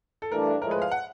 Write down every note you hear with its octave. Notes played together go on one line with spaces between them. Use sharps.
A4
G2 E3 A3 D4 A#4
A2 F3 G#3 A#4
B4
F5
F#5